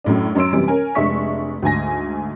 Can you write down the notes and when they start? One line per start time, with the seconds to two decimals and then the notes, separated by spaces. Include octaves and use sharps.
0.04 F#2 A2 D4
0.35 F#2 C#5 C6 E6 D7
0.53 F#2 C3 E3 G3
0.68 C#4 A#4 G#5
0.95 F1 G#3 D4 E5 C#6 B6
1.62 D2 G#2 G#5 A#6